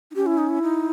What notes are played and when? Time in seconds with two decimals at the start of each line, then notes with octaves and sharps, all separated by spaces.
0.11 D#4
0.16 C#4 G4
0.26 E4
0.38 D#4
0.49 E4
0.62 D#4